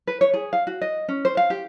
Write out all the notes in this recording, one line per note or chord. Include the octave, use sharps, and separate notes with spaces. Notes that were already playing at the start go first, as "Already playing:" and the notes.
B4
C#5
G#4
F5
F#4
D#5
C#4
C5
F5
G4